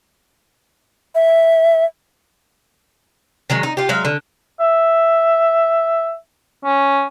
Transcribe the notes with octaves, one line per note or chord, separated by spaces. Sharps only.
E5
D#3 F#3 G#3
D#4
F4 G4
F#3 G#3 E5 F5
D3
E5
C#4